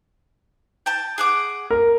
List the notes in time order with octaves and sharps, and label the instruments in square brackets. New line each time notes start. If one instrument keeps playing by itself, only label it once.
[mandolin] G5 A5
G#4 F#5 D6
[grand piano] A#4